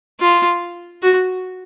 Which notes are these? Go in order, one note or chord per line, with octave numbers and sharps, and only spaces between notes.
F4
F#4